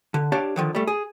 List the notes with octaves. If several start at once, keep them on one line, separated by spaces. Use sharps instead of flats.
D3
D4 G4 C#5 F5 A5
D3 D#3 F3
G3 A3
G#4